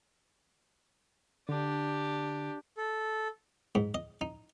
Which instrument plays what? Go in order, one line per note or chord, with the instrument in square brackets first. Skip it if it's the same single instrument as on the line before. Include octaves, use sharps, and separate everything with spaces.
[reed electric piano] D3 [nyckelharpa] D4 G4
[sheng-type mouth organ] A4
[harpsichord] G#2
D#5
D#4